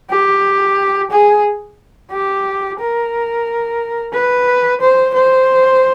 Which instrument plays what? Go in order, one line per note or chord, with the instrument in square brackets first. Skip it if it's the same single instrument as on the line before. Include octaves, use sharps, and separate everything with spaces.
[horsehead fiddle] G4
G#4
G4
A#4
B4
C5
C5